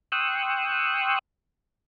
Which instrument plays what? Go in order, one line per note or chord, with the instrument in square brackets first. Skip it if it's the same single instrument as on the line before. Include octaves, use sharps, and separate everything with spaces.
[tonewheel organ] G5 C6 C#6 D#6 E6 F#6